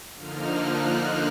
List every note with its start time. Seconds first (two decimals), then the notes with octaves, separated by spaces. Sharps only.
0.16 D3 F3 A#3 D#4 F6
0.48 F#6
0.82 F6